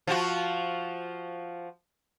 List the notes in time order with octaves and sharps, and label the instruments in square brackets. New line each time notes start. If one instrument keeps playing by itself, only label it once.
[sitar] F3 F4 F#4